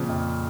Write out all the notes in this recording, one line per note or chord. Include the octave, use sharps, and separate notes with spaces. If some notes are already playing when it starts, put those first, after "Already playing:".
Already playing: A#2 C#3 F3 C4
F2